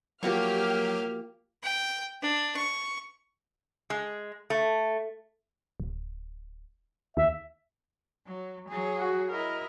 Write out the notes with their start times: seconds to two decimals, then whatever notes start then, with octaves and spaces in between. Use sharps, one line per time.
0.23 F3 F#3 A#3 F#4 G4 C#6 F6
1.63 G5
2.22 D4
2.56 C#6
3.90 G#3
4.50 A3
5.80 D1
7.17 D#2 E5
8.27 F#3
8.68 F#3 G#4
8.98 F#4
9.32 E4 A#4 D#5